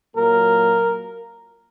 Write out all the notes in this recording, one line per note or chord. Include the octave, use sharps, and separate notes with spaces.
A#2 F#3 A#3 A#4